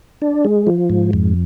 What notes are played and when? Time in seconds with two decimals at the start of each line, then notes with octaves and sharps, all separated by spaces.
0.22 D4
0.45 G#3
0.67 F3
0.90 G#2
1.13 F2